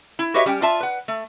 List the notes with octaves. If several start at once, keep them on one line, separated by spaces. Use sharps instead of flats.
E4
F#4 G4 B4 C#5 D#5 E5
G3 C#4 G5
F4 D5 E5 A5
B4 F#5
A3